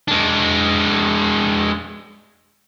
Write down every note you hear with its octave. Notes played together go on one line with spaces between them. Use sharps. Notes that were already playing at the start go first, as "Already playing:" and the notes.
G#3 D4